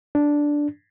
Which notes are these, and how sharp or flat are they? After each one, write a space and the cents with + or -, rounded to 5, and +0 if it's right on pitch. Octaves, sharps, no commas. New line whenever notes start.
D4 -5